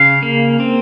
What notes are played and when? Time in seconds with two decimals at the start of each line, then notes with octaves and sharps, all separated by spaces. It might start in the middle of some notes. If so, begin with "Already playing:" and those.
Already playing: C#3 F5
0.23 A#3
0.60 C4